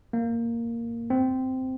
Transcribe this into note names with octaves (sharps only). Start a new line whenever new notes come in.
A#3
C4